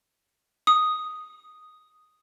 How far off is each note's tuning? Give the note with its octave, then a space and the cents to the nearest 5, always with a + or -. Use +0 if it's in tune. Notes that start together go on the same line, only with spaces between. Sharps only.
D#6 +0